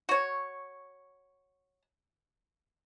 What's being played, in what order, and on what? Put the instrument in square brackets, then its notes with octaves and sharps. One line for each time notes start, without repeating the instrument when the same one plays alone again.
[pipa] F#4 C#5